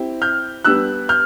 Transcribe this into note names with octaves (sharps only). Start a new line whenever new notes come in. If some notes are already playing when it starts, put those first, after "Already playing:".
Already playing: C4 E4 G4
F6 G6
G3 B3 D4 E6 F#6
F6 G6